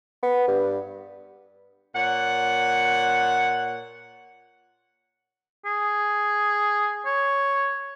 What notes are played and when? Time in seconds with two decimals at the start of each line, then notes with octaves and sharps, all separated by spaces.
0.23 B3
0.48 G2
1.95 A#2 C#5 F#5
5.65 G#4
7.05 C#5